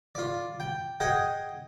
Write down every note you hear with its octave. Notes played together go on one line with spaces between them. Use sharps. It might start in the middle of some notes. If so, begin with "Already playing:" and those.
F4 D5
G5
G#4 D#5 F#5 G5